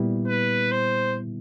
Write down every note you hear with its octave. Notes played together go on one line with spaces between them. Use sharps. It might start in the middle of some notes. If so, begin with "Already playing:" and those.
Already playing: A#2 G3 B3 E4
B4
C5